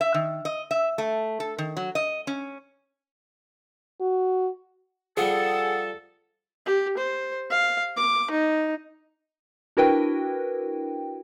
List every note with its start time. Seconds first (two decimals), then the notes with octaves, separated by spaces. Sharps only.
0.01 E5
0.14 D#3
0.45 D#5
0.71 E5
0.98 A3
1.40 A4
1.58 D#3
1.77 F#3
1.95 D#5
2.27 C#4
4.01 F#4
5.17 F3 G3 G#4 A4 F#5
6.66 G4
6.98 C5
7.50 F5
7.97 D6
8.31 D#4
9.77 D4 E4 F#4 A#4 B4 G5